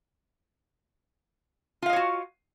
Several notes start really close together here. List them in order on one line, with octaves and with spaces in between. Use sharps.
F4 F5 D#5 C#5 F#4